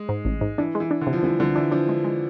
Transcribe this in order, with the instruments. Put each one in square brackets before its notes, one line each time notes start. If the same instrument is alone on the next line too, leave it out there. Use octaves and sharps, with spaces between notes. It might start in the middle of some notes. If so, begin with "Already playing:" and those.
Already playing: [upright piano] G#3
[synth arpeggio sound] G#2
A1
G#2
[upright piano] E3 [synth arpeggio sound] D4
[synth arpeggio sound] G#3
[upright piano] E3
[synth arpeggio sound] D4
[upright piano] D3
[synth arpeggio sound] C3
[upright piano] F3
[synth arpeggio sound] C2 [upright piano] E3
[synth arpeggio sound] C2 [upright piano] D3
[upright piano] E3 [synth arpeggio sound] D4
[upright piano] F3 [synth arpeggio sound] D4
[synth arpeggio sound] G#3
G#3